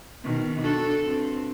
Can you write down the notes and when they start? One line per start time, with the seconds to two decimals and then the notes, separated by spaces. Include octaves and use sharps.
0.24 B2 D#3
0.60 D4 F#4 A4
1.04 G2 C4